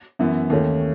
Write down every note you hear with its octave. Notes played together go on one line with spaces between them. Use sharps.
F#2 E3 B3 E4
D#2 D#3 A3 C#4